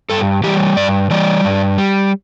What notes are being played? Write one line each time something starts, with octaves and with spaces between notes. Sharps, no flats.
G2 A4
E3 G3 G4
G2 D5
E3 G3 D5
G2
G3